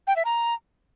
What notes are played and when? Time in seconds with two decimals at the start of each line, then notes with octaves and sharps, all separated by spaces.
0.07 G5
0.16 E5
0.25 A#5